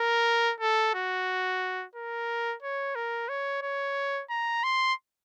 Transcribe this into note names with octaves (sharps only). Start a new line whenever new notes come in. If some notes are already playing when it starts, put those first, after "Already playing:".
Already playing: A#4
A4
F#4
A#4
C#5
A#4
C#5
C#5
A#5
C6